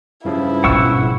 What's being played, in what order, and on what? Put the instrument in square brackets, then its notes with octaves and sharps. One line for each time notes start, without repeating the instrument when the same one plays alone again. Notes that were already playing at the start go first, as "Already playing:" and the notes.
[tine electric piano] G2 C#3 F3 [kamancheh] E4
[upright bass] G#1 B2 [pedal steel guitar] F#5 C#6 E6